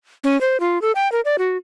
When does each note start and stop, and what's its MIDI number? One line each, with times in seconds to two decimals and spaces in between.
0.24 0.40 61
0.41 0.60 72
0.60 0.81 65
0.82 0.92 69
0.95 1.10 79
1.12 1.21 70
1.25 1.36 74
1.38 1.57 66